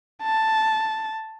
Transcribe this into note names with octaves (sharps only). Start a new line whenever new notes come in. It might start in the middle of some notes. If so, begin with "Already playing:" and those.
A5